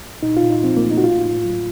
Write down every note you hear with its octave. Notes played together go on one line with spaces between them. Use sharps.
A#2 D#4
F4
A#2
D#4
F3 C4
A#3
A3
D#4
F#4
A2 F4
A2
F#3